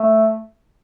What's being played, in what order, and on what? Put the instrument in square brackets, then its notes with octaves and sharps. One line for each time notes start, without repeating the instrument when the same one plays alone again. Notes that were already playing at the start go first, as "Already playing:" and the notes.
Already playing: [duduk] A3